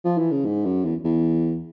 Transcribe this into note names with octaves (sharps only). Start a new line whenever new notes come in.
F3
E3
C#3
G#2
F#2
E2
E2